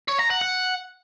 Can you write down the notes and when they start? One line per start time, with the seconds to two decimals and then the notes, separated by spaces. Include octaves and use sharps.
0.08 C#5
0.19 A#5
0.30 F#5
0.41 F#5